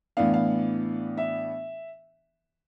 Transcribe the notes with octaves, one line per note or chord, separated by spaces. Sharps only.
A2 E3 B3 D4 F5
F5
E5